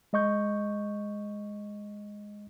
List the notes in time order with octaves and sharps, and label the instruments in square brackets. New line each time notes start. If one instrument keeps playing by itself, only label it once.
[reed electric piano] G#3 D#5 C#6 G6